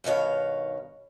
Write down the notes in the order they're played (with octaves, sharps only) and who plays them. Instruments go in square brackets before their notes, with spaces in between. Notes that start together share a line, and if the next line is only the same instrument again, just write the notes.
[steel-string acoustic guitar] G2 B2 D#3 C#5 F5